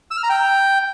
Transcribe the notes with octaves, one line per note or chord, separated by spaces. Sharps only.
E6
F6
A#5
G5